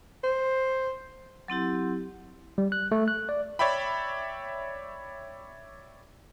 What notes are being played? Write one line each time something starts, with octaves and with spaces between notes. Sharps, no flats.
C5
F#3 C4 E4 G4
G3
F#6
A3
F#6
D5
C#5 D5 E5 G5 B5